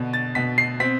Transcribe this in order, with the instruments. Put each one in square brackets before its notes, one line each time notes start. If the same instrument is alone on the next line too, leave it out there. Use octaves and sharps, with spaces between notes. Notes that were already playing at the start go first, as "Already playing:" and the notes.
Already playing: [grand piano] B2 D3
A6
B2 B6
C7
C4 B6